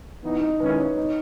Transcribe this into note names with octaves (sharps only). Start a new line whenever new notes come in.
E3 B3 D#4
D#4
D#3 G#3 C#4 E4 B4
C#5
D#4